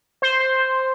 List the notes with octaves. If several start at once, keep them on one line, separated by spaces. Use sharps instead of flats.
C5